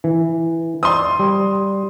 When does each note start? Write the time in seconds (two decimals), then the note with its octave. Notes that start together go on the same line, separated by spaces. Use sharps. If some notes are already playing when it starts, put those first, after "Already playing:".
0.04 E3
0.83 C5 D5 C6 D#6
1.19 G3